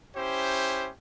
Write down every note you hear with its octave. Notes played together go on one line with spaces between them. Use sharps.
C#4 E4 G4 C5